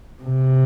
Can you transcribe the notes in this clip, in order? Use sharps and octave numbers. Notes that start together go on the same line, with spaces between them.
C3